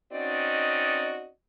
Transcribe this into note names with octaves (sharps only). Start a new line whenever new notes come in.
C4 C#4 D#4 F#4 D5 D#5